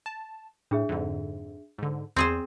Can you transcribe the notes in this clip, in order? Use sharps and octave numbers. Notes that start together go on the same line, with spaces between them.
A5
A2 D4 G#4 E5
F2 G#2 D3
G#2 D3
E2 C4 G#4 C5 C6